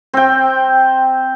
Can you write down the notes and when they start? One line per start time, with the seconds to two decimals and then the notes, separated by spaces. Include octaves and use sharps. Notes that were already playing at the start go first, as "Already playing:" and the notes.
0.13 C4 G5